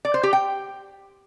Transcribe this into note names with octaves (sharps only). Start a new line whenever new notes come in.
D5
C5
G4
G5